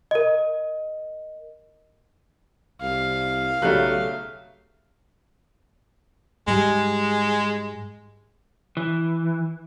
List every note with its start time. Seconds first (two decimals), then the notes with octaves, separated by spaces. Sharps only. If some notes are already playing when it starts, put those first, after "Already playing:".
0.11 A#4 D#5
2.81 C2 F5
3.62 B1 C#3 F#3 G3 A3 F#6
6.48 G#2 G3 G#3
8.77 E3